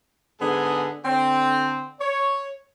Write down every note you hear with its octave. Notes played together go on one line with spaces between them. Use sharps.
G#2 D3 B3 G#4
D3 C4
C#5